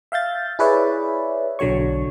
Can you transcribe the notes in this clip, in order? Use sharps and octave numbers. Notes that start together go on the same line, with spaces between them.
E5 F5 G6 A6
E4 G#4 B4 C#5 D5 E5
B1 D3 F#3 C#5 C#6